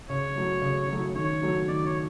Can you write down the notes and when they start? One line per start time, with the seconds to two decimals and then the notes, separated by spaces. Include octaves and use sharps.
0.09 C#3 C#5
0.36 F#3 A3
0.62 C#3
0.88 F#3 A3
1.15 D#3 C#5
1.42 F#3 A3
1.67 D#3 D5
1.86 C#5